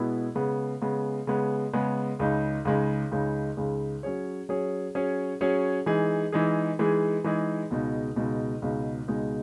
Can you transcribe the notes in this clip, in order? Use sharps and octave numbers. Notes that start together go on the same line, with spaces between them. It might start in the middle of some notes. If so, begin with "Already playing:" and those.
Already playing: B2 G#3 B3 E4
C#3 G#3 B3
C#3 G#3 B3
C#3 G#3 B3
C#3 G#3 B3
C#2 C#3 G#3 D#4
C#2 C#3 G#3 D#4
C#2 C#3 G#3 D#4
C#2 C#3 G#3 D#4
F#3 C#4 G#4 C#5
F#3 C#4 G#4 C#5
F#3 C#4 G#4 C#5
F#3 C#4 G#4 C#5
E3 G#3 D#4 G#4
E3 G#3 D#4 G#4
E3 G#3 D#4 G#4
E3 G#3 D#4 G#4
C#2 B2 G#3 D#4
C#2 B2 G#3 D#4
C#2 B2 G#3 D#4
C#2 B2 G#3 D#4